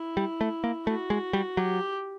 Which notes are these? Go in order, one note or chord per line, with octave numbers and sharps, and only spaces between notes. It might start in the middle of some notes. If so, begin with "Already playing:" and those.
Already playing: E4
G3
A3
A#3
A3 F#4
G#3
G3
F#3 G4